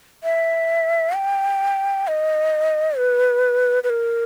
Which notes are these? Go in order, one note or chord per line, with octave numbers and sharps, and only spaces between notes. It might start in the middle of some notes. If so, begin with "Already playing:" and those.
E5
G5
D#5
B4
B4
A#4